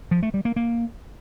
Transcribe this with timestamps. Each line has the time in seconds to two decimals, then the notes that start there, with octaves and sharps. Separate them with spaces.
0.11 F3
0.23 A3
0.34 G3
0.45 A#3
0.56 A#3